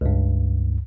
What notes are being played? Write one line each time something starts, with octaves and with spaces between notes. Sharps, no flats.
C#2 G2